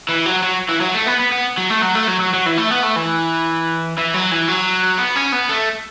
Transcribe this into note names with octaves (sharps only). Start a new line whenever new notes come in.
E3
F#3
F#3
E3
F#3
A3
B3
B3
B3
F#3
A3
F#3
A3
F#3
F#3
F#3
E3
A3
B3
A3
E3
E3
F#3
E3
F#3
B3
C#4
B3
A3